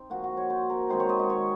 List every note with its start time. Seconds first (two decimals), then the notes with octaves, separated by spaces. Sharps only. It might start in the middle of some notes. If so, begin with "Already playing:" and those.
Already playing: C4 D#4
0.10 A#2 F3 A#3 F#4
0.24 F#4
0.37 C#5
0.50 C5
0.70 A#4
0.89 D#3 G#3 C4 C5
1.00 C#5
1.09 D#5
1.19 D#5
1.30 C#5